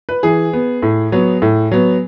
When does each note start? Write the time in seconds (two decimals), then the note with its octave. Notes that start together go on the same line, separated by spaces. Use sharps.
0.09 B4
0.23 E3 G#4
0.53 B3
0.83 A2
1.12 F#3 B3
1.42 A2
1.72 F#3 B3